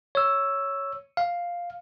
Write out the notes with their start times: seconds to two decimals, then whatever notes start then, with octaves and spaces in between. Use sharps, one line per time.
0.15 C#5 E6
1.17 F5